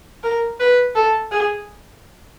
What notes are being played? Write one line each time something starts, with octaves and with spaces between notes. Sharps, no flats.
A#4
B4
A4
G#4